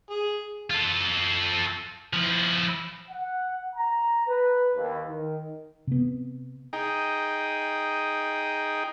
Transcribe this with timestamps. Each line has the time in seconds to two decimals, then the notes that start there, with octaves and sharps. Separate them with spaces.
0.10 G#4
0.70 F4 A4
2.13 F3 E4
3.09 F#5
3.75 A#5
4.28 B4
4.75 D#2
5.07 D#3
5.87 C3 B3
6.73 D#4 G#4 G5